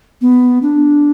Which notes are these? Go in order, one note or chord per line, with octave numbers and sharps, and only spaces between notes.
B3
D4